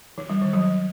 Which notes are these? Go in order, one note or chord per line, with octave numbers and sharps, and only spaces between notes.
E3
G3
D#3
F#3